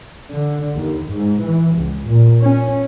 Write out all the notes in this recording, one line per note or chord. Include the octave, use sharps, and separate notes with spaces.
D3
D#2
G#2
E3
C#2
A#2
C#4